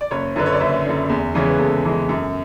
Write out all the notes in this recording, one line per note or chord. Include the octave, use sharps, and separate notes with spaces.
D5
F#1 C#5
F#2 D3 B4
C#5
D5
F#1 E5
F#2 D3
E2
C#3 E3 G#3 C#5
B4
E2 A4
C#3 E3 G#3
F#2